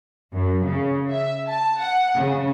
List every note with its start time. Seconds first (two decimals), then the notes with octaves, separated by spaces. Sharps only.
0.33 F#2
0.66 C#3
1.09 E5
1.47 A5
1.80 F#5
2.18 C#3